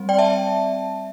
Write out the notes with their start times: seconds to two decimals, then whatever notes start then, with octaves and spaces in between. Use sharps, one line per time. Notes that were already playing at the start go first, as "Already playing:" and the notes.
Already playing: G3 C4
0.09 D5 G5
0.18 E5 A5